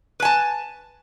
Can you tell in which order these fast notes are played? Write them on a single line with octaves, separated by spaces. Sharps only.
B4 G#5 A5